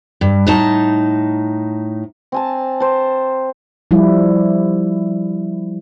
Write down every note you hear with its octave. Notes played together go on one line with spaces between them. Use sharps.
G2
A2 D#4 A5
C4 G#5 A5
C5 A5
F3 G3 E4